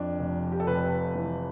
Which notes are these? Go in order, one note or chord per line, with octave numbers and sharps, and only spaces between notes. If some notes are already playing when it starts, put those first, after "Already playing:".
Already playing: F2 D4
F1
G4
A4
F1 B4
E3